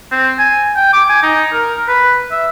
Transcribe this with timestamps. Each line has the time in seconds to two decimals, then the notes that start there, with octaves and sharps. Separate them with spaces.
0.11 C4
0.39 G#5
0.76 G5
0.93 D6
1.09 G#5
1.23 D#4
1.53 A#4
1.88 B4
2.31 E5